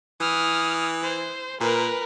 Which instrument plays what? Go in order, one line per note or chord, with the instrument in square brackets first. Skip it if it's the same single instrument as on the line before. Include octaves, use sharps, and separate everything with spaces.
[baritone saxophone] E3 [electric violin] D#6 F6
[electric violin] C5
[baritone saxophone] A#2 [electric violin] A#4 B4